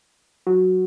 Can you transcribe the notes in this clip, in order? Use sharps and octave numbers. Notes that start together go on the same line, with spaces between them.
F#3